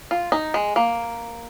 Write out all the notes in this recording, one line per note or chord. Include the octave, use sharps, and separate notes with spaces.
F4
D#4
G#3
A#3